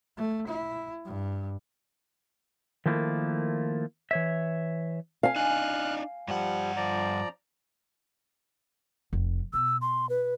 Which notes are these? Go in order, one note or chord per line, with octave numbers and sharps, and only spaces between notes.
A3
E4
G2
D#3 F3 A3 A#3 E4
E3 C#5 E5
F5 G#5
D4 D#4 F6 F#6
G2 F3 G3 F#5
F3 D5 A#5
F1
B2 E6
C6
B4